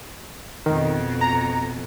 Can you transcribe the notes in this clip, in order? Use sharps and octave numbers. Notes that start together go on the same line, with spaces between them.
F2 B2 D#3
A#5